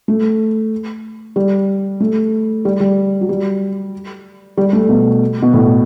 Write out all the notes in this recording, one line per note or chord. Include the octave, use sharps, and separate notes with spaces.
A3
G3
A3
G3
G3
F#3
G3
G3
A3
B2
B2
A2